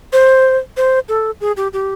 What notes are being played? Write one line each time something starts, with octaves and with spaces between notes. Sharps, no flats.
C5
C5
A4
G#4
G4
G4